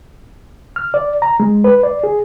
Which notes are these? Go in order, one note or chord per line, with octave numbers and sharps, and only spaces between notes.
F6
D5
A#5
G#3
B4
D5
G#4